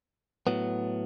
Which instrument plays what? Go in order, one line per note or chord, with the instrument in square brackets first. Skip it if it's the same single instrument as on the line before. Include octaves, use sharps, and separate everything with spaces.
[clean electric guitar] A2 F#3 B3